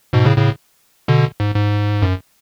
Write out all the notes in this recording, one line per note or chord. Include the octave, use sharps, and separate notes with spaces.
G#2 B2
A2 C#3
A2 C#3
B2 D3
G#2
G#2
F#2